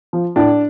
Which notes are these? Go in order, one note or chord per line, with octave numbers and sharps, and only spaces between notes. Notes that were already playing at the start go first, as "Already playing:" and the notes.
F3
A2 D4